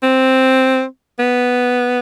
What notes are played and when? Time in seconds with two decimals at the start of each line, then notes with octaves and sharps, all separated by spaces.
0.03 C4
1.19 B3